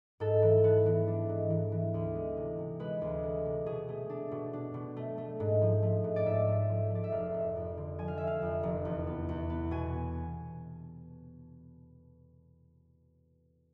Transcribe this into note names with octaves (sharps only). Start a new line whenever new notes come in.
G#2 A4
E3
B3
E3
D4
G#2
E3
E3
D2
G#3
C3
C3
G#3 B4
D2
G#3
C3
B2 G#4
A3
D4
B2
D4
B2
A3
A3
G#2
F3
A3
G#2
D5
G#2 E5
A3
F3
A3 D5
E5
F1 F5
F1
F2
D3
F3 G#5
F5
F3 E5
F5
F2
F1
E2
B3
E2
B3
B2 G#5